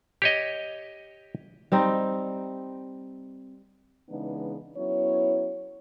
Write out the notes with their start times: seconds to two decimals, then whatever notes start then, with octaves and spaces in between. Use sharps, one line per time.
0.22 G4 C#5 D#5
1.72 G3 C4 D#4
4.09 C#3 E3 G#3 B3 D4 D#4
4.76 F#3 B3 C#4 E4 C#5